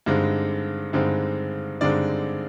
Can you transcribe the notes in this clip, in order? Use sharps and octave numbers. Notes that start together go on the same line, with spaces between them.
G2 D3 G#3 C4 D#4
G2 D3 G#3 C4 D#4
G2 D3 G#3 C4 D#4 D5